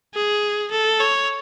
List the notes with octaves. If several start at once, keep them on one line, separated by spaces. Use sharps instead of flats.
G#4
A4
C#5